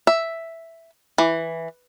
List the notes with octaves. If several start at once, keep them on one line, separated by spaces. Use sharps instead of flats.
E5
E3